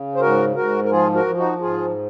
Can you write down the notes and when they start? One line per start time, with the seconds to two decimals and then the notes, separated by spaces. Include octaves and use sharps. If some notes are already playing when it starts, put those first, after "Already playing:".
Already playing: C#3
0.16 C5
0.20 G#2 F#4 A#4
0.55 G#2 F#4 A#4
0.84 A#4
0.91 F3 F4 G#4
1.15 F#4 A#4
1.26 F3
1.38 D#4 F#4
1.61 G#2 F4 G#4